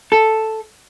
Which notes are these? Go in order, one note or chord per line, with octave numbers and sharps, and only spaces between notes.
A4